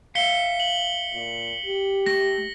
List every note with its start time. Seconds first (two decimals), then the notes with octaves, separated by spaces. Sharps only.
0.15 E5 F5 B6 C#7 G7
0.60 F#7
1.14 A#2
1.66 G4
2.06 A3 A#6